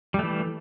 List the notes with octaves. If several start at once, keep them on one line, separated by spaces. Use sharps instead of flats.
E3 G3 A3